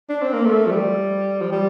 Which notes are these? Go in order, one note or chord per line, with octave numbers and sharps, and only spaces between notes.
D4
C4
A#3
A3
F3
G3
F3
G3